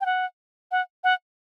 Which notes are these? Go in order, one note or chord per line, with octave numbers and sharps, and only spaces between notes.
G5
F#5
F#5
F#5